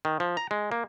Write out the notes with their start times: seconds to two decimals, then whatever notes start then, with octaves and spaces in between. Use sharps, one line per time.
0.05 D#3
0.20 F3
0.37 A#5
0.51 G#3
0.72 A#3